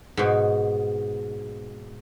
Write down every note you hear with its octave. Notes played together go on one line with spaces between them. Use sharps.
G#2 B2